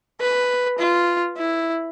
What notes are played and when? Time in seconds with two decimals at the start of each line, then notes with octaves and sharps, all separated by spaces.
0.20 B4
0.78 F4
1.37 E4